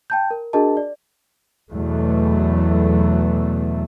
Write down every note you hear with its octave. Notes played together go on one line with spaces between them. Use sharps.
G5 A5 G6
A#4
D4 F#4 G#4 A#4 D#5 A5
D5
E2 B2 E3 F#3 A3